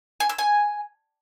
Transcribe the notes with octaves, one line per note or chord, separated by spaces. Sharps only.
G#5
E6
G#5